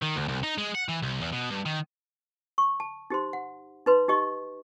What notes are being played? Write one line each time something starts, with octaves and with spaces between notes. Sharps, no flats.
D#3
D2
C2
D#4
G#3
F#5
E3
C2
E2
B2
G2
D#3
C#6
A5
D#4 G4 C5 C6
F#5
D#4 B4 C6
D#4 G4 D#5 C#6